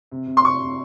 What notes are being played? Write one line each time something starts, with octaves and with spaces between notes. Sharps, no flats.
C3
C3
C6
C3 C#6
C3